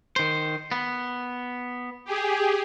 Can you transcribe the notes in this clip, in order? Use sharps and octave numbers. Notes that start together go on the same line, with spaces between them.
D#3 C5
B3
G4 G#4